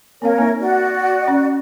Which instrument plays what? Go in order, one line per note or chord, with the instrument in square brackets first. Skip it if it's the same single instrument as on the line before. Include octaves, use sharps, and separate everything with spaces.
[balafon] A#3 C4 F5 [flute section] A#4 C#5
[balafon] A#3 D#4 E5
[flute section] F#4 D5
[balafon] C#4 A5